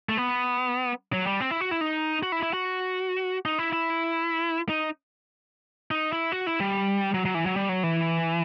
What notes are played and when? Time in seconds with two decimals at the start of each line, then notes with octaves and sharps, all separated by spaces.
0.09 A3
0.17 B3
1.13 F#3
1.27 G3
1.40 C4
1.51 E4
1.61 F#4
1.71 E4
1.81 D#4
2.23 F#4
2.32 E4
2.43 E4
2.53 F#4
3.46 D#4
3.59 E4
3.73 E4
4.69 D#4
5.91 D#4
6.13 E4
6.32 F#4
6.47 E4
6.60 G3
7.14 F#3
7.25 F#3
7.35 E3
7.46 F#3
7.56 G3
7.69 F#3
7.83 E3